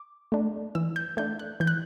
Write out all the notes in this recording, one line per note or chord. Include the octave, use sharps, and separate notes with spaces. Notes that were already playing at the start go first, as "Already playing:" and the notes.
Already playing: D6
A3 D4
E3 E6
G6
A3 D4 G6
F#6
E3 G6
F#6